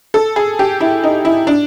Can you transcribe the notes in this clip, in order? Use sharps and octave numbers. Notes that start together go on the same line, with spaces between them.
A4
G#4
G4
E4
D#4
E4
D4